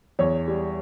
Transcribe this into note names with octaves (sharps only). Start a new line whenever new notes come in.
E2 C#5
G3